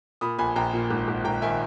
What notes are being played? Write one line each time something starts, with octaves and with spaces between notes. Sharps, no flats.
A#2 B5 D#6
A#1 G#5 B5
A#1 G5 A#5
A#2
G#1
G#1
G#1 G5 A#5
D#3 E5 G#5